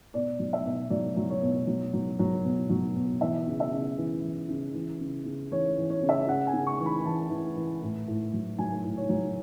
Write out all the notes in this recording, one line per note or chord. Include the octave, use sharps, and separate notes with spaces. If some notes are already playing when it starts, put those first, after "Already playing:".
B2 D5
F#3
E5
B2
F#3 D5
F#3
C#5
B2
F#3
F#3
F#3
B2
F#3
B2
E3 E5
C#3
E5
C#3
E3
E3
C#3
E3
C#3
C#3
E3 C#5
E3
C#5
C#3
E5
C#3 F#5
G#5
C#3
C#6
E3
B5
E3 A5
E3
E3
A2
A2
F#3
F#3 G#5
A2
C#5
F#3